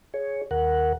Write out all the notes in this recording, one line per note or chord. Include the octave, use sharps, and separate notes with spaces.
G#4 C#5
D#2 A#4 F#5